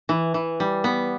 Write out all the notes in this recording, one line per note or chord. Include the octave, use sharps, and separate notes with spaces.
E3
E3
G3
B3